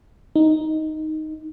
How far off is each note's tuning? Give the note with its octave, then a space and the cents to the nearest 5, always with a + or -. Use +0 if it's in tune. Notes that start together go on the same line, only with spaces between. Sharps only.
D#4 +5